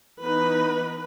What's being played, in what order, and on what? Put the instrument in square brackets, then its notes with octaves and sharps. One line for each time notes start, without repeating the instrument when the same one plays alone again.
[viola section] E3 B3 D#4 B4